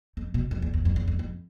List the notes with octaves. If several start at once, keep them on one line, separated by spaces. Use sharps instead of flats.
F2
B2
F#2
E2
E2
F2
E2
F2
F2